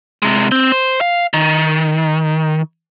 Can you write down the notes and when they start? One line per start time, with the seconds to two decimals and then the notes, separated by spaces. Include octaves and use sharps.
0.23 C3 G#3
0.52 C4
0.72 C5
1.01 F5
1.34 D#3